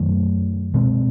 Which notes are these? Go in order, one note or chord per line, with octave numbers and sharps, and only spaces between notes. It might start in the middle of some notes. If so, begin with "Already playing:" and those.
Already playing: F#2 D#3 F#3 A3
B2 G#3 C4